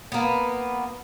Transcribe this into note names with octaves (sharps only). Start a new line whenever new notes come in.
A#3 B3